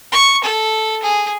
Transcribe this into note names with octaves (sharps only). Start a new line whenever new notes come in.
C#6
A4
G#4